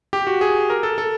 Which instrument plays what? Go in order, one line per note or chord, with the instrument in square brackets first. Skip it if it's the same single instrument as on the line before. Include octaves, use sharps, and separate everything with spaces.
[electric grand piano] G4
F#4
G#4
A#4
A4
A4